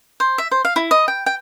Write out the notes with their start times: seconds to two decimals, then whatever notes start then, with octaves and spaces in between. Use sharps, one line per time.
0.20 C5
0.38 E5
0.51 C5
0.65 F5
0.76 E4
0.91 D#5
1.08 G5
1.26 G5